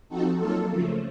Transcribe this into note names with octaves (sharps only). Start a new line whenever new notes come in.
F3 C4 D#4 F#4 A4
F#3 A#3 F4 A4
C#3 F3 A3